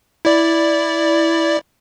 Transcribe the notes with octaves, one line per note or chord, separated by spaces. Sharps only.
E4 D5